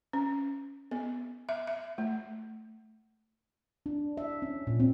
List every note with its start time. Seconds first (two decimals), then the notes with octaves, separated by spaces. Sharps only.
0.13 C#4
0.91 B3
1.49 E5
1.67 E5
1.98 A3
3.86 D4
4.17 E5
4.42 C#4
4.67 A#2
4.80 C4